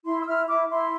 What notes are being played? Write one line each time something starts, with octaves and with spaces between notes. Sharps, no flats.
E4 C6
E6
E4 F6
E4 D6
E4 C6